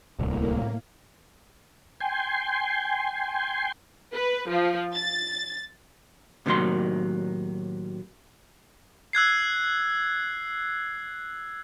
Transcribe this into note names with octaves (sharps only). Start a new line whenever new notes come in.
D1 C2 A2 A#3
G5 G#5 C6
B4
F3
A6
A2 C3 D#3 F#3 A#3 C6
E6 F#6 G#6 C7